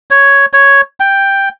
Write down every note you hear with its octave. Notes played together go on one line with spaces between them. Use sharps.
C#5
C#5
G5